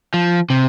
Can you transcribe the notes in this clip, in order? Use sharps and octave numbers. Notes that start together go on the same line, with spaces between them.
F3
C3